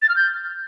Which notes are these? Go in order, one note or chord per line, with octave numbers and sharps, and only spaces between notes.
A6
F6
G6